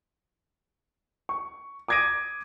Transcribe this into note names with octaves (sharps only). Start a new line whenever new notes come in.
C#6
D6 D#6 G#6 A#6 D7 D#7